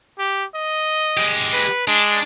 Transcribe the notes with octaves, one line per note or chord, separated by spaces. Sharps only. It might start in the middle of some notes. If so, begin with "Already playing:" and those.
G4
D#5
G#3 G4
B4
G#3 D4